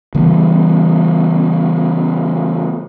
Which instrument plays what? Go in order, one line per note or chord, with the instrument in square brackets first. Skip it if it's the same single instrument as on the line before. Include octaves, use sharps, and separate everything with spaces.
[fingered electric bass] C#3 E3 G3 B3